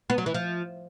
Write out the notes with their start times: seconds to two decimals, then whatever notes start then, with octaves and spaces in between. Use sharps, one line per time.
0.10 B3
0.18 F#3
0.26 E3
0.34 F3